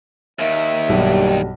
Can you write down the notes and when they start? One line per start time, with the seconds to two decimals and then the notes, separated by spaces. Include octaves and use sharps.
0.39 D#2 D#3 E5
0.89 B1 G2 G3